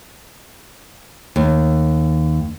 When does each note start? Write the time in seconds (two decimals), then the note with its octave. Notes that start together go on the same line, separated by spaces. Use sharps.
1.36 D#2